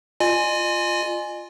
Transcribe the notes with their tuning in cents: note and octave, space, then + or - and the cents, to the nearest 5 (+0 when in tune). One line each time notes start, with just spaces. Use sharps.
F4 +0 D#5 -40 G#5 +0